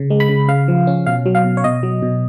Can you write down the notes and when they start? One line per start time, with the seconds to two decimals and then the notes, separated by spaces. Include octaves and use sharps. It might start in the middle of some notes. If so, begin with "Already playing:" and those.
Already playing: C#3
0.10 G#3
0.20 B5
0.29 C#3
0.48 C#3 F5
0.68 F3
0.87 C#4
1.07 B2 F5
1.26 F#3
1.35 F5
1.44 B2
1.57 C#5
1.64 B2 D#5
1.83 F#3
2.02 B2